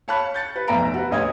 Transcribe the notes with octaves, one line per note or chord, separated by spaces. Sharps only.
C#5 F5 A5 B5 C#6 F#6
G6 A6 C#7
B4
F1 B1 E5 A#5 D7
F#4 B4
D2 C#5 D#5 D#6 E6 G#6